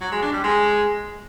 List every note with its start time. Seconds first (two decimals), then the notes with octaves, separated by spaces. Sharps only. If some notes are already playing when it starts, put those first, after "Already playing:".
0.01 F#3
0.12 G#3
0.22 D4
0.33 G3
0.44 G#3